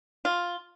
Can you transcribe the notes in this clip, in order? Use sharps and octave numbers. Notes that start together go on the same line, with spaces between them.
F4